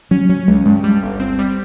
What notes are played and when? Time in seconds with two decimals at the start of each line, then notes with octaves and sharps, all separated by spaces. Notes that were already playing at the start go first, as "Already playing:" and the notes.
0.11 F#3 C#4
0.29 F#3 C#4
0.48 C#2 G#3
0.66 G2 G#3
0.84 G3
1.03 G1
1.20 C4
1.39 G3